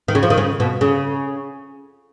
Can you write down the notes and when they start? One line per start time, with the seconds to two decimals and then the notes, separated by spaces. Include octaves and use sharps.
0.08 D#3
0.15 C#3
0.23 F3
0.30 D#3
0.38 C#3
0.60 B2
0.81 C#3